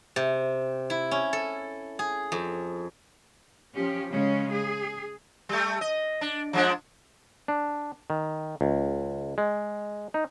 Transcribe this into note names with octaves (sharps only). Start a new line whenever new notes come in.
C3
E4
C#4
A4
G#4
F2
F3 C#4 G4
C#3 G#3 C#4
G#4
G3 A3
D#5
D4
F3 G#3 D4
D4
D#3
C#2
G#3
D#4